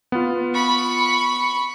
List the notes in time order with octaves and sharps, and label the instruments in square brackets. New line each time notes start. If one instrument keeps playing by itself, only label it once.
[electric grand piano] B3 F4
[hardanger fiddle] B5 C#6